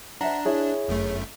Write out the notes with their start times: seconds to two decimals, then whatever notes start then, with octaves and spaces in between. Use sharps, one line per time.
0.21 D4 C5 E5 F#5 A#5
0.45 E4 G#4 C#5 E5
0.88 G1 F#2 A3